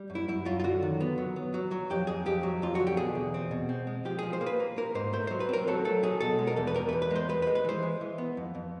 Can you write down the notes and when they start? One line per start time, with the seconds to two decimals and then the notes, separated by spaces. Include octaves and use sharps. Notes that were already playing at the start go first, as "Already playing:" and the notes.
Already playing: G3
0.10 F#2
0.15 E4
0.28 F#2 E4
0.45 F#2 F4
0.60 F4
0.64 D3 F#4
0.83 D#3
1.01 B3
1.18 F#3
1.36 B3
1.54 F#3
1.71 F#3
1.90 F2 G4
2.07 F2 G#4
2.26 F2 G4
2.43 F#3
2.62 F2 F4
2.75 D3 F#4
2.87 G4
2.97 B2 G#4
3.15 E2
3.34 C4
3.51 B2
3.69 C4
3.87 G#3
4.05 F3 G4
4.19 F3 G#4
4.33 C5
4.41 A#3
4.46 B4
4.60 A#3
4.77 A#3 A#4
4.95 G#2 C5
5.13 A3 C5
5.27 F#3 C5
5.40 B4
5.49 C4 A#4
5.67 F#3 A4
5.85 A3 A4
6.03 F#3 G#4
6.21 B2 A4
6.39 G#3
6.47 A#4
6.56 E2 A4
6.67 B4
6.74 E2 A#4
6.89 E2 B4
7.02 B4
7.11 G#3
7.16 C5
7.29 G#3 B4
7.42 B4
7.47 G#3
7.55 B4
7.65 E3 C5
7.83 G#3
8.01 E3
8.18 B3
8.37 F2
8.55 F2